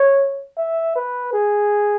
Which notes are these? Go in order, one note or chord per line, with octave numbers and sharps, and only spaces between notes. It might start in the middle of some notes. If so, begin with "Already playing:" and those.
Already playing: C#5
E5
B4
G#4